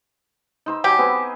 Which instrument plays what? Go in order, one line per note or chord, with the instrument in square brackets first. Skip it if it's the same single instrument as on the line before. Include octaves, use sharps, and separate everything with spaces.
[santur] D#4 C5 E6
[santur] F#3 G#5 [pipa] G4
[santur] B3 C4 G#4